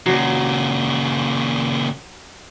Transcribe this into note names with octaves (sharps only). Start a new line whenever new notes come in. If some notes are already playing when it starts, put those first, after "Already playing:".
A#2 C#3 F#3